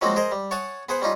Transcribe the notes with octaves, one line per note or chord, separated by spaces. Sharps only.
F3 F#3 G#3 A#3 C4 F#4
G#4 A#4 C5 D#5
G3
C#5 F#5 G#5 A5 D#6
B3 G#4 C5 F#5
G3 C#4 D#4 F4